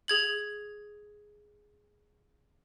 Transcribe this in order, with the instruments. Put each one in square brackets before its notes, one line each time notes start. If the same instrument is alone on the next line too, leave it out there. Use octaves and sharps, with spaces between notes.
[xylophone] G#4 G#6 F#7